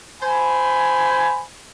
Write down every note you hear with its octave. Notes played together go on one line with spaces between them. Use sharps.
C5 G#5 B5